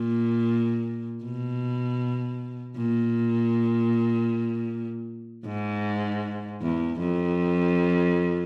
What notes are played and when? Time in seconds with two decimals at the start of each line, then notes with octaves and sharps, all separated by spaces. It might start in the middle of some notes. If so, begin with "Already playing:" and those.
Already playing: A#2
1.24 B2
2.77 A#2
5.46 G#2
6.62 E2
7.00 F2